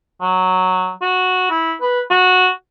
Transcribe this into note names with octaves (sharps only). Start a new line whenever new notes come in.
F#3
F#4
E4
B4
F#4